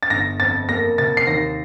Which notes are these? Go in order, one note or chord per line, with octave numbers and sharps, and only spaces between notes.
A6
G1 A#6
F2 A6
A#3 A#6
C3 A6
C7
D#2 A#6